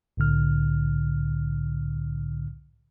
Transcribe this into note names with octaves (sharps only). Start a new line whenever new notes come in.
C2 A2 D3 F6